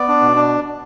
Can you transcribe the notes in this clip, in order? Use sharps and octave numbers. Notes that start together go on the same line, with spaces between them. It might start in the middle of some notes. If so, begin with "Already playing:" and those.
Already playing: B3 D5
D4
B2
D4